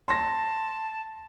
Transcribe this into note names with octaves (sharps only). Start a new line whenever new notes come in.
A5 C6 A#6